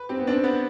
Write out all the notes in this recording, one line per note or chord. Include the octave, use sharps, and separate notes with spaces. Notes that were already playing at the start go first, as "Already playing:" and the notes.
Already playing: B4
C4 G4
B3
C4 D4
B3